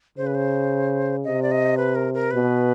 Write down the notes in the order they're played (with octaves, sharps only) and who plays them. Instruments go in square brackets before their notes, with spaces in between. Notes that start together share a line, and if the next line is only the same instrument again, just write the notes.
[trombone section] C#3 [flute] C5
[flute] B4
C5
[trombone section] C3 [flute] D#5
[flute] D5
D#5
B4
A#4
A#4
[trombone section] B2 [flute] B4